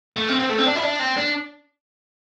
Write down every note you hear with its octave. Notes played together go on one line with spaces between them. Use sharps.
A3
C4
C4
A3
C4
D4
E4
D4
C4
D4